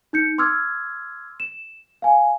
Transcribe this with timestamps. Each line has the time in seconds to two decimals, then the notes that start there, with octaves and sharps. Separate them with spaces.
0.13 D#4 G6 C#7
0.38 C6 D6 E6 F6 G#6
1.40 E7
2.02 F5 G#5